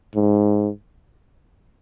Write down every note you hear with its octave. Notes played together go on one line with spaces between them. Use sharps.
G#2